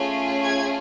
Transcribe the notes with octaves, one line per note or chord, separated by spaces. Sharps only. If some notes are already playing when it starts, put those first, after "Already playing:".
Already playing: A3 C#4 F4 G#4
G#6